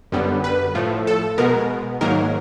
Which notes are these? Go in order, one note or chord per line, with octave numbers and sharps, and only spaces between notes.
F#2 D3 G3 B3
B4
A2 F3 A3
A4
B2 G#3 B3 A#4
G#2 D#3 F#3 A#3 A#4